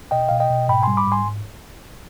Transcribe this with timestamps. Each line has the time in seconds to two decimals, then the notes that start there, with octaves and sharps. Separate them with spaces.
0.11 B2 D#5 G5
0.29 B2 F5
0.40 D#5 G5
0.50 B2
0.69 G#2 G5 B5
0.83 G3 G#5 C6
0.97 B5 D6
1.07 G#2 G#5 C6